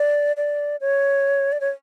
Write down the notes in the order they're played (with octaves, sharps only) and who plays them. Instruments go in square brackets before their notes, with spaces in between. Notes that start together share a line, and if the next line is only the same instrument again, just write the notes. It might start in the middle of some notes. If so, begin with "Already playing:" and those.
Already playing: [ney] D5
D5
C#5
D5
C#5